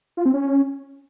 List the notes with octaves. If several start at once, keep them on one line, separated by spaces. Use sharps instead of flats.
F4
C4
C#4